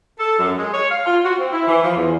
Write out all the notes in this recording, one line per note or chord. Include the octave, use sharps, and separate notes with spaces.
A4
F#2
G#3
C#5
F5
F4
F#4
C4
E4
E3
F3
E2